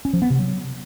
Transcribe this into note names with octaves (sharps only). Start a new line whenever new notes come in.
C#4
F3
B3
C3
F#3